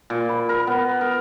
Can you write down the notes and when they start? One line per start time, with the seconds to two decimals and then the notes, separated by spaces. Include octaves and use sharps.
0.10 A#2
0.29 B5
0.49 A#4
0.67 B3
1.01 A#4